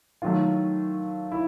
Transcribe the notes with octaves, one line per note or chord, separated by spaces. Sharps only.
D#3 F#3 A3 F4
E4